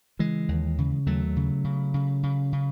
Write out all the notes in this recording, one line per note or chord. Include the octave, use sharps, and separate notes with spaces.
C#3 E3 G#3
D#2
C#3
D#2 F#3 A3
C#3
C#3
C#3
C#3
C#3